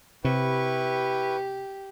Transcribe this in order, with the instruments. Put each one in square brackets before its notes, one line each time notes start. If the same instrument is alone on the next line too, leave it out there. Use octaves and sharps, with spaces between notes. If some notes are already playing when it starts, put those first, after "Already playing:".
[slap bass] C3 [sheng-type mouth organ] E4 B4 C#6 [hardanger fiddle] G4